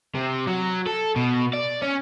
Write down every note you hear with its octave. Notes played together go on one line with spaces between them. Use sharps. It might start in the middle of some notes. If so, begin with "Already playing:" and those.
C3
F#3
A4
B2
D5
C#4